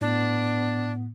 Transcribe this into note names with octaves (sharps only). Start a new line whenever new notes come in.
A2 B3 D4